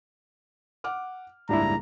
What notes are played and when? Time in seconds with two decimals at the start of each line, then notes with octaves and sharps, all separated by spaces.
0.84 F#5 D6 F6
1.49 F#1 C#2 G#2 G3 D4 E4 A#5